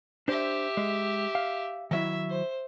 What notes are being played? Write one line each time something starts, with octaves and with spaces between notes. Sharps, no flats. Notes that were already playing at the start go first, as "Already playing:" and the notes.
D4 G4 C5 E5
G#3
F5
D#3 F#3 E4 E5
C5